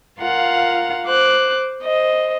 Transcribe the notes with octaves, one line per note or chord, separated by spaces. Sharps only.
F4 A#4 F5 F#5
C5 D6 F#6
C5 D#5